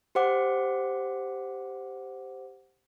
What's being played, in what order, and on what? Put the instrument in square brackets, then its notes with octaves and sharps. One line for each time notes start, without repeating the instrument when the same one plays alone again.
[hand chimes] G4 C5 F#5 D6 C#7